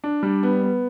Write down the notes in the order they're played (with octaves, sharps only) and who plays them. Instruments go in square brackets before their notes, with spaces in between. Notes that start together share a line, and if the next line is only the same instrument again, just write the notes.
[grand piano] D4
G3
B3
B3